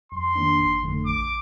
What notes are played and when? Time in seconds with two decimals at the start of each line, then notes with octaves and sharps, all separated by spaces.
0.12 F2 C6
0.35 D#3 A#3 D4
0.60 G1
0.83 F2 D3 A3
1.06 A#1 D6